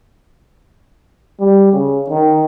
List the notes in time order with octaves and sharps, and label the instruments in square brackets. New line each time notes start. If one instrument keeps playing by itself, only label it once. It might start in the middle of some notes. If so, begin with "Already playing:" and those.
[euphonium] G3
C#3
D#3